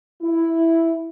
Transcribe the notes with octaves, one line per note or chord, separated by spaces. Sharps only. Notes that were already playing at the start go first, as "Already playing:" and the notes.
E4